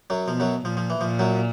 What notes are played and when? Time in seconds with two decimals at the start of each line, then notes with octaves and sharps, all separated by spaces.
0.10 F#2 F#3
0.28 B2 F3
0.40 F#2 F#3
0.65 A#2 F3
0.77 F3
0.90 E3
1.01 A#2 F3
1.19 F#2 F#3